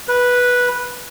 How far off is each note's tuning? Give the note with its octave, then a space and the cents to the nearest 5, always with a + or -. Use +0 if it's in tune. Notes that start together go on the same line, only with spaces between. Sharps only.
B4 -10